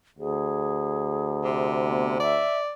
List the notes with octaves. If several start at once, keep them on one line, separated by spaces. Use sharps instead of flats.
D2 G#4
C3
B3
D5 E5